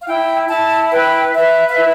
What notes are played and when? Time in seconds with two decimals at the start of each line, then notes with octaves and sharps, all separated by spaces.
0.01 F5
0.07 E4 G5
0.49 E4 A5
0.91 B4 G5
1.34 B4 E5
1.69 F5
1.76 E4 E5